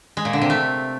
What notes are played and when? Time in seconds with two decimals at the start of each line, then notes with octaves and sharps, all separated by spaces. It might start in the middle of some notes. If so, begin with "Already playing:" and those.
0.17 G#3
0.25 A#2
0.33 D3
0.42 C3
0.50 A3